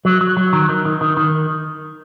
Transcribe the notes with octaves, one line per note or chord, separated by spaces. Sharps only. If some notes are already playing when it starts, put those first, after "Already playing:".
F#3
F#3
F#3
D#3
D#3
D#3
D#3
D#3